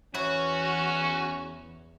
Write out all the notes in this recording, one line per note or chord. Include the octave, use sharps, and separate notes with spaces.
E2 C#4 F#4 B4 C#5 E5